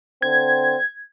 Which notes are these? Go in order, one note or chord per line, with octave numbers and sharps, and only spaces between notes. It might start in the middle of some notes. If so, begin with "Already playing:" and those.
D3 C4 G#6